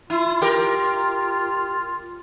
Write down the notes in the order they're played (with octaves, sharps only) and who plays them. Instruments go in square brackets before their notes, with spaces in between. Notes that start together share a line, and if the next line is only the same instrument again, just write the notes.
[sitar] E4 [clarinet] F4
[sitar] G4 A#4